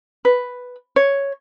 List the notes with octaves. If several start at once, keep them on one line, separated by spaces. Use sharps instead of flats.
B4
C#5